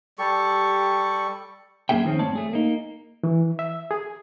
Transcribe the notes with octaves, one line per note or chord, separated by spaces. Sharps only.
G3 G4 A4 C#6
F#2 A3 A#3 G#4 E5 G5
D#3 F3 C4 C#4
G2 A3 C4 C#5 D5 A5
A3 G#4
A#3 D#4
E3
E5
G#4